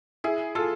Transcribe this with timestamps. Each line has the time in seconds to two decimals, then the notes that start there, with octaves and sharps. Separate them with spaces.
0.24 E4 G#4
0.55 F4 A4